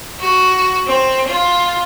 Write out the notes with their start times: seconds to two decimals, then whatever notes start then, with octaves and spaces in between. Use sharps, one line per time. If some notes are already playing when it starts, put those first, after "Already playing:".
0.20 F#4
0.87 C4
1.28 F4